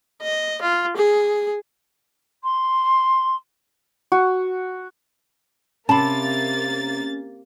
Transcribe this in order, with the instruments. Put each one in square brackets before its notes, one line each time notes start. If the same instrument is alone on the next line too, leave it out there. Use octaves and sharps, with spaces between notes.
[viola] D#5
F4
G#4
[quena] C6
[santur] F#4
[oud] C3 [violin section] A#3 A6 [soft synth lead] C#4 [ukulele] A5 B5